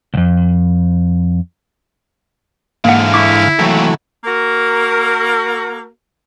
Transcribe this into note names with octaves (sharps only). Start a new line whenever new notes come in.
C2 F2
G#2 D3 E3 A#3 F5 F#5
E4 C#6 D6
D#2 C3 E3 F#3 A3
A#3 F#4 A#4